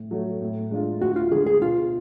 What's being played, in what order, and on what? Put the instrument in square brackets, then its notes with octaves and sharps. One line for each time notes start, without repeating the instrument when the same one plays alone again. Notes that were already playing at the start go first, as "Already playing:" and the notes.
Already playing: [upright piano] A2
F#3 A3
A2
G#3 D4 F4
[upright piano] D2 [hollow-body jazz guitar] F#4
[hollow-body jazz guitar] F4
[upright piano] D3 G#3 [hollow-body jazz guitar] G#4
[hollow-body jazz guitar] G#4
[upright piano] B2 [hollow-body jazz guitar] F4